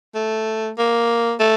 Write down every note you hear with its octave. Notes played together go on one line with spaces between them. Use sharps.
A3
A#3
A3